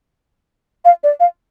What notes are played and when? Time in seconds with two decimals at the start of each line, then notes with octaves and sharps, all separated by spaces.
0.85 F5
1.04 D5
1.20 F5